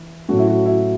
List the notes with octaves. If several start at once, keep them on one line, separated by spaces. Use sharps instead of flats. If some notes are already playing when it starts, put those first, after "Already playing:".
Already playing: E3
A2 F#3 A3 C#4 F#4
E4
F#4
E4